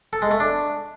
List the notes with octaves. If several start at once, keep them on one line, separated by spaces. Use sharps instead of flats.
A4
G#3
A3
D4